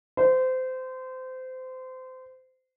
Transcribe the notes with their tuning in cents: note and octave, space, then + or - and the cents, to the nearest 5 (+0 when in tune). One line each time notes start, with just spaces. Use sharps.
C5 -25